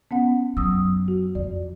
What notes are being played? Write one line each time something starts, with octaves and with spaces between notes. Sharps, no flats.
B3 C#4 F#5
F#2 F#3 D#6 E6
F#4
F2 D5